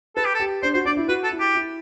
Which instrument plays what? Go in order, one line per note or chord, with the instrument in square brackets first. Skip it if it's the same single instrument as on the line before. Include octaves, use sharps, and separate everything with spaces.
[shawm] A4 [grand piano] B4
[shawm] G4
A4
[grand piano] G4
[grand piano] D4 [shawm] C5
[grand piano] F#4 [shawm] C5
[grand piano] D4 [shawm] D5
[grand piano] E4
[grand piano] F#4 [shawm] B4
[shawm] A4
[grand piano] E4
[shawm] G4
[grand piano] E4